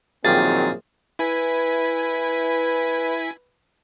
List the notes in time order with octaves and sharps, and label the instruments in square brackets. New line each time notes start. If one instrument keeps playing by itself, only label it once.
[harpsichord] A#1 F4 G4 [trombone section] D#3 F#3 C4 [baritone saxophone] G#4 [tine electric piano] A6
[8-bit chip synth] E4 G#5 B6 [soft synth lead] B4